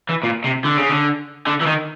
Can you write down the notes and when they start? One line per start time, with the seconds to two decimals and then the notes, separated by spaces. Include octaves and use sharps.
0.09 E3
0.23 A#2
0.44 C3
0.64 D3
0.77 C#3
0.89 D3
1.47 D3
1.61 E3
1.67 D#3